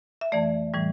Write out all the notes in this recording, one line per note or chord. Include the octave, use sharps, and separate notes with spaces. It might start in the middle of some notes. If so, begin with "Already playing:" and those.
E5
F2 E3 A3 D5
A2 E3 G3